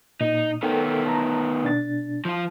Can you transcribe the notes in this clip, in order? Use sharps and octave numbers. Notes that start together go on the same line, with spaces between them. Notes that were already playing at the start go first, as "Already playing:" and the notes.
A#2 D#4
D#3 B3 A4 A#4 G5
A5 A#5
B2 D4 A6
F3 F4